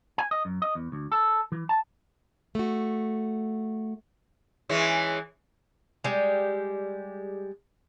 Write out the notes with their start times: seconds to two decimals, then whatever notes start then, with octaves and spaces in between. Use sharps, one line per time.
0.18 G#5
0.31 D#5
0.45 F#2
0.62 D#5
0.75 E2
0.92 D2
1.12 A4
1.52 E3
1.69 A5
2.55 A3 F#4
4.69 E3 G#3 C#4
6.04 G3 G#3